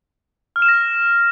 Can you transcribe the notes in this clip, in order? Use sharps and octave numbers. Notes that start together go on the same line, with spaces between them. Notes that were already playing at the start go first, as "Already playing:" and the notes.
F6
E7
A#6